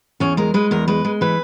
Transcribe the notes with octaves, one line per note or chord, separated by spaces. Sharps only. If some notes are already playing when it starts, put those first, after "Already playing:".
E2 C#4
G#3 A#4
G#3 B4
E2 A#4
G#3 B4
G#3
E3 B4